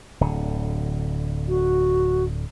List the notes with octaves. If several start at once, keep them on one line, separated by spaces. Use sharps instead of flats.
D1 D3
F#4